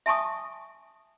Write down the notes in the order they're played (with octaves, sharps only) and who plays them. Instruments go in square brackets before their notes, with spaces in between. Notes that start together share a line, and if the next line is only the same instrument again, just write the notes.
[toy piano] E5 G#5 A5 C#6 D#6